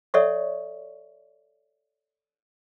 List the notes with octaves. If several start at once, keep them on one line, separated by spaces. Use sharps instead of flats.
A4 C#5 D5 E5 F#5 C#6